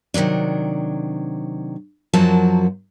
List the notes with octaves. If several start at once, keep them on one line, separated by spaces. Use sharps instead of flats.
C3 D#3 F3 F#3 D4
F#2 F3 F#3 A#3 F#4 A5